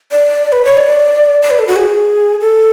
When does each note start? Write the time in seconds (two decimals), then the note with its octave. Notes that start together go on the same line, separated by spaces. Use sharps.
0.12 D5
0.52 B4
0.65 C#5
0.77 D5
1.42 D5
1.51 B4
1.59 A4
1.67 F#4
1.76 G#4
2.41 A4